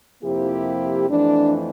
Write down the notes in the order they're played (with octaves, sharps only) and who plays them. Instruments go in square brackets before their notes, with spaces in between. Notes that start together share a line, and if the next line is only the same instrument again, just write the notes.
[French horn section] F2 C3 F3 A#3 E4 G4
F2 E3 A3 D4